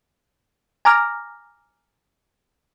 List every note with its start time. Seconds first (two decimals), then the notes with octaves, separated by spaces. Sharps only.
0.85 G#5 A#5 D6 F6 A#6